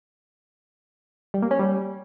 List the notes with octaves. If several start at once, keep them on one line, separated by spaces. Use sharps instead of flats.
G3
A#3
C#4
G3